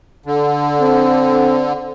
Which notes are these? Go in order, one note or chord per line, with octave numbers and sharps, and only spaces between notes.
D3
C4